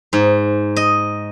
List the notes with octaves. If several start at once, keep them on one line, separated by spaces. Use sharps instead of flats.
G#2
D#5